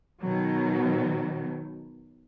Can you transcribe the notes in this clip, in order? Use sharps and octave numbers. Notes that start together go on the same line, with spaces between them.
B2 D#3 F#3